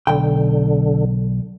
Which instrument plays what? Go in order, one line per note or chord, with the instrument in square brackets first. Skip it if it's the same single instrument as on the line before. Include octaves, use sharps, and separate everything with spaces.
[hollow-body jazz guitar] B1 G5 [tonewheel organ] D3